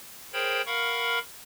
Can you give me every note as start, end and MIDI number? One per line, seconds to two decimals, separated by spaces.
0.33 0.62 68
0.33 0.62 70
0.33 0.62 72
0.33 0.62 73
0.33 0.62 79
0.33 0.62 83
0.66 1.19 70
0.66 1.19 77
0.66 1.19 78
0.66 1.19 83
0.66 1.19 85
0.66 1.19 89